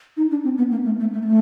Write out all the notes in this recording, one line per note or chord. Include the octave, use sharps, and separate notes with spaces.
D#4
D4
C4
B3
A#3
A3
A3
A3
A#3
A3